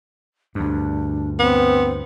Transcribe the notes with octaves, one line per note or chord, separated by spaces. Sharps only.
D2 G2 D4
B3 C4